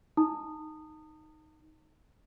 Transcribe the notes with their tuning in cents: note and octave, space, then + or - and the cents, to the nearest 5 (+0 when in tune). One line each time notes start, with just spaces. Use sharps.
D#4 +0 A5 +45 D#6 -15